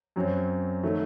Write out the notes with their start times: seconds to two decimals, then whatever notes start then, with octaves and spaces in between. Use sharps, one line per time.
0.16 F#2 F#3 C4
0.83 D#3 F#3 A3